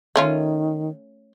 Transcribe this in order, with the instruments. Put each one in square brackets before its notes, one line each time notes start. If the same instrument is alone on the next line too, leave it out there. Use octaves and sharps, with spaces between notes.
[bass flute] D#3 [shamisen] A3 C#4 F4